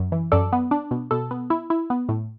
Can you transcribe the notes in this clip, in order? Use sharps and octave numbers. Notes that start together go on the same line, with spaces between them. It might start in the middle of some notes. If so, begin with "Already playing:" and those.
Already playing: F#2
E3
F#2 A4 D5
B3
D4
B2
B2 A4
B3
E4
E4
B3
A2